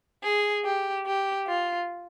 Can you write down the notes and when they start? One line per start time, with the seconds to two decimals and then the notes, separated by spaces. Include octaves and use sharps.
0.23 G#4
0.64 G4
1.06 G4
1.47 F4